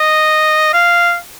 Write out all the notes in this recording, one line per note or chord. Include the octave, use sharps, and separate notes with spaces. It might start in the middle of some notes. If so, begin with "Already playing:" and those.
Already playing: D#5
F5